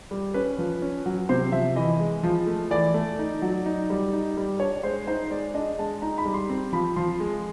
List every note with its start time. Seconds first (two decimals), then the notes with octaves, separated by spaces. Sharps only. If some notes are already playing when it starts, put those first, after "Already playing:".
0.11 G3
0.34 C#4 B4
0.58 F3
0.82 C#4
1.06 F#3
1.29 C3 C5
1.52 F3 E5
1.76 E3 D#5
2.00 G#3
2.23 F3
2.47 A3
2.71 E3 D5
2.94 A3
3.19 D#4
3.42 F#3
3.66 D#4
3.90 G3
4.13 D#4
4.37 G3
4.60 D4 C#5
4.83 G#3 C5
5.07 D#4 C5
5.31 G#3 D5
5.54 D4 D#5
5.79 G#3 A5
6.02 D#4 A#5
6.18 B5
6.25 G3
6.34 C6
6.50 C4
6.73 F3 B5
6.96 F3 C6
7.20 G#3